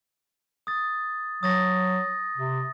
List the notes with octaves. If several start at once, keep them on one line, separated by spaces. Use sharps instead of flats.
D#6 A6
F#3 D#6 A6 A#6
C3